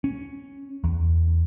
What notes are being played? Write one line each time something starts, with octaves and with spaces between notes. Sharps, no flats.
C#4
E2